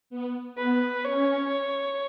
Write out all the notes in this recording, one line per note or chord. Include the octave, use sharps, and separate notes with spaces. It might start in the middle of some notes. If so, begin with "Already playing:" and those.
B3
B3 B4
C#4 C#5